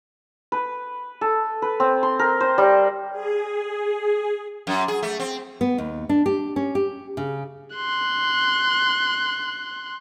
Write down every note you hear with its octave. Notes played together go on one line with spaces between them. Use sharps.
B4
A4
B4
C4
C6
A#4
C5
G3
G#4
F#2
G#4
A3
C4
B3
D#2
D4
G4
C#4
G4
C#3
C6 F#6